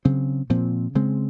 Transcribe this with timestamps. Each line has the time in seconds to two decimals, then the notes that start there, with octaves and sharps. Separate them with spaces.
0.05 C#3 F#3 C4
0.50 A#2 F3 C4
0.95 C#3 G#3 C4